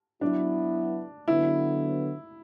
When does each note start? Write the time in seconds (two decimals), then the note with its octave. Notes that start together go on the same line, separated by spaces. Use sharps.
0.21 F#3 B3 D4 E4
1.28 D3 F#3 B3 E4